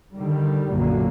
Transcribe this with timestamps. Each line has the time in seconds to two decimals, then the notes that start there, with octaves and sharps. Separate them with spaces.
0.16 D3 D#3 G3
0.70 B1 F#2 A#2 D3 F#3 A#3